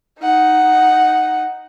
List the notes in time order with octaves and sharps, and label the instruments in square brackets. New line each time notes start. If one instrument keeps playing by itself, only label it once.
[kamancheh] D#4 F#5